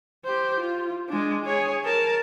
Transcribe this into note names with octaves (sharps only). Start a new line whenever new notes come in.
G4 C5
F4
G#3 D4
G#4 C#5
A#4 A5